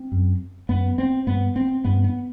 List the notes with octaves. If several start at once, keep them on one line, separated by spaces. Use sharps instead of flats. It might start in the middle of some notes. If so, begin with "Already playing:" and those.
Already playing: C4
F#2
F#2 B3
C4
G2 B3
C4
G2 B3
B3